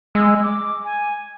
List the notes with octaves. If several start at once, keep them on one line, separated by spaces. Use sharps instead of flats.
G#3 E6
D6
G#5